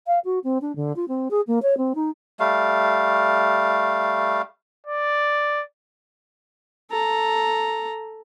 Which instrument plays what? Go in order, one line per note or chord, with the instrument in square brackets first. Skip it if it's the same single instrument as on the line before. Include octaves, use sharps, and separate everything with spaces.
[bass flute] F5
F#4
C4
D4
D3
F4
C4
G#4
A#3
C#5
C4
D#4
[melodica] G3 A3 F5
[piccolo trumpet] D5
[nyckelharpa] A4 A#5